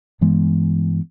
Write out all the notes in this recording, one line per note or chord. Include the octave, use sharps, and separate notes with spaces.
G2 E3 G#3 B3